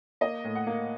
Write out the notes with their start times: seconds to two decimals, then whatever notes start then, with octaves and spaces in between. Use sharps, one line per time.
0.21 A#3 D#5
0.44 A2
0.55 F#5
0.66 A#3